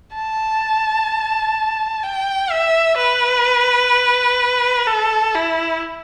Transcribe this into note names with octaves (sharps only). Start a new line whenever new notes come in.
A5
G5
E5
B4
A4
E4